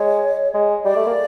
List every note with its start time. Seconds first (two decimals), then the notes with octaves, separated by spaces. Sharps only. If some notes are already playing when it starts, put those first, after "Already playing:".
Already playing: G#3 C#5
0.54 G#3
0.85 G3 D5
0.96 A3
1.06 A#3